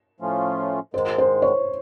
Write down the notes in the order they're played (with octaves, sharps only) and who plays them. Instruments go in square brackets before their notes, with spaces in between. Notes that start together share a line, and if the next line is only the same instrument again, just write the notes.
[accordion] A2 F3 A3 C#4 F4
[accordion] G#2 D#3 G#3 [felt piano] C5
[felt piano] C5
C#5